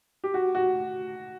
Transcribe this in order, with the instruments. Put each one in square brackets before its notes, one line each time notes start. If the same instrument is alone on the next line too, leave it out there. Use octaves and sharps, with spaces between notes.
[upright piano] G4
F#4
F#4